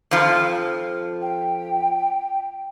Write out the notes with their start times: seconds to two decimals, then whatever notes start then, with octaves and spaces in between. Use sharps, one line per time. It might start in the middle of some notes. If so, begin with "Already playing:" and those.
0.11 F2 F3
1.22 G5